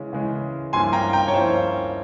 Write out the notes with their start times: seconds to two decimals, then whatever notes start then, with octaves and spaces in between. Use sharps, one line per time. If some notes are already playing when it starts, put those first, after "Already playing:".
Already playing: C#3 E3 G#3 C#4
0.13 C#3 E3 G#3 C#4
0.73 G2 F3 A#3 C#4 E4 G#5 C6
0.93 G5 A#5
1.13 G5 A#5
1.28 C#5
1.33 G2 F3 A#3 C#4 E4 C5